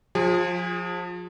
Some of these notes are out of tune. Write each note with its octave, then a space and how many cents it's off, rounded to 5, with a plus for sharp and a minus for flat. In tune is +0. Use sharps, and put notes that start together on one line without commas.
F3 +30 F4 +0 G#4 -25